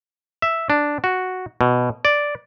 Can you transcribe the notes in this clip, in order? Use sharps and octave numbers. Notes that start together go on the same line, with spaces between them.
E5
D4
F#4
B2
D5